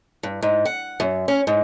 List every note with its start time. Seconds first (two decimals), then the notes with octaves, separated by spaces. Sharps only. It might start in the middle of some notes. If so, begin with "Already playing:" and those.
0.23 G2
0.42 G#2
0.66 F#5
1.00 F#2
1.28 C#4
1.47 G#2